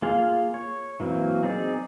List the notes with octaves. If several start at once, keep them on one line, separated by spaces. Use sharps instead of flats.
A#3 F4 G#4 F5
C#5
E3 F#3 A#3 C4
C4 D#4 G#4 D5